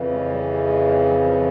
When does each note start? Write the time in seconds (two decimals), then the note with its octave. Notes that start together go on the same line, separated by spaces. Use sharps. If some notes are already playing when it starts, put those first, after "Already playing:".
Already playing: F2 C#3 E3
0.11 G#3
0.30 G3
0.49 G3
0.67 G#3
0.86 G#3
1.05 F#3
1.23 F3